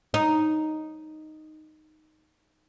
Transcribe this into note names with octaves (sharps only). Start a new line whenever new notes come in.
D#4